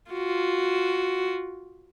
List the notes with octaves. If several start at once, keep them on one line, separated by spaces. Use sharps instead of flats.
F4 F#4